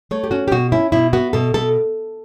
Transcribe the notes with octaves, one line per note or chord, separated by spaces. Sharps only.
A3 C#5
G4
C#4 F#4
G4
B2 F#4
C#4 E4
B2 E4
B3 F#4
B2 A4
B2 A4